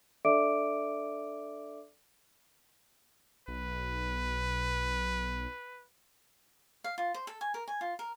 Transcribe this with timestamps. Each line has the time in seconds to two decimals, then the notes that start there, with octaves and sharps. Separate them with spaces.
0.25 D4 A4 D5 E5 D6 D7
3.48 B1 B4
6.84 F5
6.98 F4
7.14 C5
7.27 A4
7.41 G#5
7.54 A#4
7.68 G#5
7.81 F4
7.99 A#4